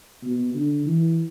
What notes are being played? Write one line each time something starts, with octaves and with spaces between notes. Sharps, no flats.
B2
D3
E3